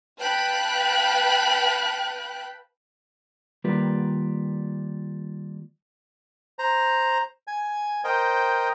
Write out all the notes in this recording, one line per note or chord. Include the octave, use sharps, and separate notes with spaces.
B4 F5 G5 A5 B5 F#6
D#3 G3 A#3 F4 G4 B4
C5 A#5
G#5
A#4 C5 D#5 G5